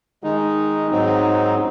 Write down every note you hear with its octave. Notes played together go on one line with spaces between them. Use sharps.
D#3 G#3 D#4
G#2 F#3 C4 D#4